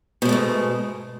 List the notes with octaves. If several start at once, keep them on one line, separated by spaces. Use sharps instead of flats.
G#2 B2 G#3 A3